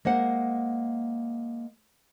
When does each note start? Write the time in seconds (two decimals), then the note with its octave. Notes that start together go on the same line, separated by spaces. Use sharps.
0.05 G#3 A#3 C5 F#5